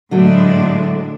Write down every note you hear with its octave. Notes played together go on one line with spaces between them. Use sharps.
A2 D3 F#3 G#3 A3 D4